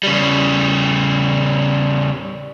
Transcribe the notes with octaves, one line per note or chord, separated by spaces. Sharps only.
C#3 G3